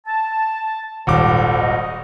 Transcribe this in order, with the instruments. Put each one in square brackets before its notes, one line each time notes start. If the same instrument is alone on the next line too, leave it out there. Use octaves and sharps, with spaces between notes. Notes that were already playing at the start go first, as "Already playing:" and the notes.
[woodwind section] A5
[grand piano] D#1 G#1 D6 [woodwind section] G3 A4 C5
[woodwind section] D#5